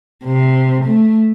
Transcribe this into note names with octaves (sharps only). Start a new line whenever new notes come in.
C3
A3